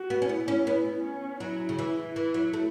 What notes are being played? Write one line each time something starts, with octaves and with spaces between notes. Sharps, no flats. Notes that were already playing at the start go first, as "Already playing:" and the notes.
Already playing: F#4
B3
C#4
B3 E4
C#4
B3
C#4
F#3 E4
C#3
E3
E3 E4
F#3
A3